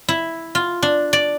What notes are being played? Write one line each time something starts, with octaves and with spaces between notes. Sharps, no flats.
E4
F4
D4
D5